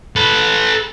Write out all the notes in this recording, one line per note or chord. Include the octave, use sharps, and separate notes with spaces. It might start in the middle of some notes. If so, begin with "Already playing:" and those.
A4 B4